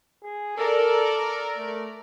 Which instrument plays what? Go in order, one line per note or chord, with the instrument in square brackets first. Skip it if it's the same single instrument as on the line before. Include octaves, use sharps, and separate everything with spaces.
[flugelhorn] G#4
[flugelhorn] A4 [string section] A#4 D5
[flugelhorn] A3